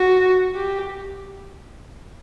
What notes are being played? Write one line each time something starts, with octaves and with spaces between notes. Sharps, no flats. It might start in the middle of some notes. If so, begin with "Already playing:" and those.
Already playing: F#4
G4